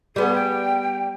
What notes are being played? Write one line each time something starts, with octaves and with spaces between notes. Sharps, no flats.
G3 B3 G#4
G5